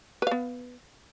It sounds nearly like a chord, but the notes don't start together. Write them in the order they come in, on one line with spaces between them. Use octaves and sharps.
B4 F5 B3